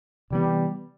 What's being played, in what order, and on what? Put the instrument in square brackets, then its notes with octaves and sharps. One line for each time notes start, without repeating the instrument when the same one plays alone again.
[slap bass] C3 E3 B3 [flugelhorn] G3